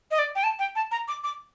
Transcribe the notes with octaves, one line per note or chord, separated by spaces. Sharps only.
D#5
D5
G5
A5
G5
A5
A#5
D6
D6